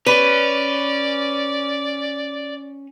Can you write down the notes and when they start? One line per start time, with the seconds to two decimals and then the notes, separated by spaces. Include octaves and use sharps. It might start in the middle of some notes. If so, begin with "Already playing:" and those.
0.06 C#4 B4 D5